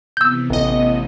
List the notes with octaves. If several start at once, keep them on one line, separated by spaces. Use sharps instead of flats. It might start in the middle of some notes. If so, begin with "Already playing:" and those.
C3 E3 B3 E6 G6
A1 D#5